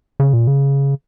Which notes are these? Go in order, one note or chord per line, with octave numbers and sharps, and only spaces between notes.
C#3
A#2
C#3